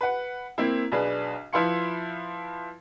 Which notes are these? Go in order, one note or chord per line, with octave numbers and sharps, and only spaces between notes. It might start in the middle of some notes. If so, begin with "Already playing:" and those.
B4 F#5
A#3 C4 E4
B1 D4 G#4 B4
F3 E4 B4 F5 C6 C#7